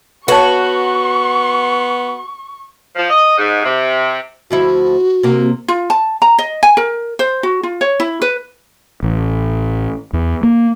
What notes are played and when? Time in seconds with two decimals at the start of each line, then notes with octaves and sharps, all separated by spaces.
0.28 B3 F#4 B4 C#5 A5 C#6
2.96 F3
3.10 D#5
3.37 G#2
3.63 C3
4.50 D2 F3 E4 F#4
5.23 C3 A#3
5.68 F4
5.90 A5
6.22 A#5
6.39 D#5
6.63 G#5
6.77 A#4
7.19 C5
7.43 F#4
7.63 F4
7.81 C#5
8.00 E4
8.22 B4
9.03 A1
10.13 E2
10.43 A#3